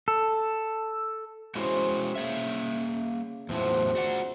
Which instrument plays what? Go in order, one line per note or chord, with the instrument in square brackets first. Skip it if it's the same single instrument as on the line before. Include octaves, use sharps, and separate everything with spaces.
[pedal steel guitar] A4
[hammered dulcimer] C#3 C5 [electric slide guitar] G#3 E4 F#4
[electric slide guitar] A#3 C#5 E5
[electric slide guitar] E2 A2 F#3 [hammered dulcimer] F3 E5
[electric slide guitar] F#4 D5 F#5